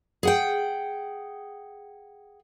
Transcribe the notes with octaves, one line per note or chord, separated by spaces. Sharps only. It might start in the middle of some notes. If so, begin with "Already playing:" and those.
G#4 F#5 G5